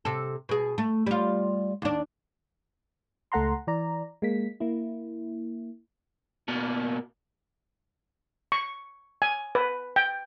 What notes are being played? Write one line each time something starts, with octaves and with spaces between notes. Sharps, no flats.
C3 A4
B2 G#4
A3
G3 F4
D#2 D4
C#2 A3 A4 F#5 A#5 C6
E3 D5 A#5
G#3 A#3 B6
A#3 E4
B2 A#3
C#6
G#5
B4
G5